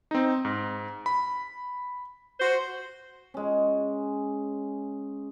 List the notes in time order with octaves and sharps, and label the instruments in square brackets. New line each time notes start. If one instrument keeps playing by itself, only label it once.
[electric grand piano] C4 D#4
G#2
B5
[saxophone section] F#4 C5
[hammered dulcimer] G#3 C#4